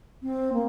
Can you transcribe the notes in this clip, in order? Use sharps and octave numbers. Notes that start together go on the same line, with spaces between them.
C4
A#3